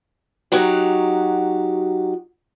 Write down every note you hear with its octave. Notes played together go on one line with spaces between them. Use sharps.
F#3 D#4 F#4 G4